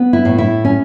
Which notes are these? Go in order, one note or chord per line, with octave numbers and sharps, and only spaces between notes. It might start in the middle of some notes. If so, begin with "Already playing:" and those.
Already playing: B3
E4
A2
E4
C#4